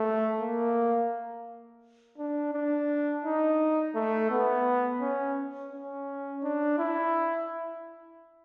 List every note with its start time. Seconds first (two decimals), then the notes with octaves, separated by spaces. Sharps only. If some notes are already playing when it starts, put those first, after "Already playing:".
Already playing: A3
0.41 A#3
2.18 D4
2.54 D4
3.24 D#4
3.95 A3
4.31 B3
5.01 C#4
5.72 C#4
6.43 D4
6.79 E4